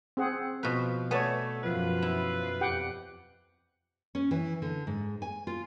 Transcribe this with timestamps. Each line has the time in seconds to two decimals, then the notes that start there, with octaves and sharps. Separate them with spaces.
0.17 C4 G#4 F#5
0.63 B2 F3 B4
1.11 A3 B3 C#5 D5 G#5 A5
1.63 F#2 F3 F4 B4
2.02 E4
2.61 F2 G4 F#5 G5
4.15 C#4
4.31 E3
4.62 D3
4.87 G#2
5.22 G#5
5.47 F4